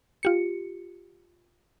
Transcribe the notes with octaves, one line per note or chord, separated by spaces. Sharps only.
F4 G4 C#7